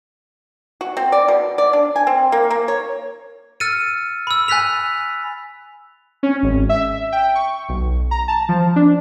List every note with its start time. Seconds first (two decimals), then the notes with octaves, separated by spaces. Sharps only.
0.81 F#4
0.97 C4
1.12 D5
1.28 B2
1.58 D5
1.73 D4
1.96 G#5
2.07 C4
2.32 A#3
2.50 A#3
2.68 C#5
3.60 E6 F6 A6 C#7 D#7
4.27 B5 E6
4.48 G#5 F#6 A6 B6 F7
6.23 C#4
6.43 G#1
6.69 E5
7.12 G5
7.35 C#6
7.69 B1
8.11 A#5
8.28 A5
8.49 F3
8.76 D4